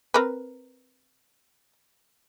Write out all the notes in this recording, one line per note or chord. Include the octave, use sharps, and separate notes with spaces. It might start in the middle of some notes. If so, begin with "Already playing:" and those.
C4 A#4 B4